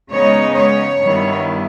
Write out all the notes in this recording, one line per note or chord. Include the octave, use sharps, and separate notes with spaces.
C#3 G#3 B3 D#4 C#5
C#5
G2 D#3 G3 B3 E4